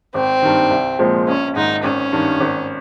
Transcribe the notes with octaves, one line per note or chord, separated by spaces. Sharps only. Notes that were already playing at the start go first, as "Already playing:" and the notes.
G#1 C4
G2 D#3
C2
A#2 F3 G#3 C4
A#1 C#4
G#2 D#3 D#4
G#1 C#4
G2 D#3
G#1